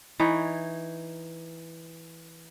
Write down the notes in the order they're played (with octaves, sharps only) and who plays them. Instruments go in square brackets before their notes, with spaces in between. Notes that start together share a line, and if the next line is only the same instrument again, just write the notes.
[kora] E3 D#4 C#5